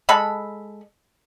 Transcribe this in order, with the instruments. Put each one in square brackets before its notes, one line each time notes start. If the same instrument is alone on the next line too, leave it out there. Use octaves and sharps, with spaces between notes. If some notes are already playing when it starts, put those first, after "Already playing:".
[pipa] G#3 A4 B5